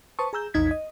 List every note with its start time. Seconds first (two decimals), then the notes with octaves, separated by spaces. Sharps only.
0.19 B4 C5 A5 C#6 D#6
0.33 G#4 A#5 E6 G6
0.54 A#1 E2 D#4 G#6 B6
0.71 D#5